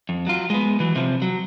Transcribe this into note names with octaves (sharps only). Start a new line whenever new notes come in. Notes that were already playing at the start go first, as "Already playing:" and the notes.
F2
F#3 F4
G#3 B3
E3 F#3
C3 F3
F#3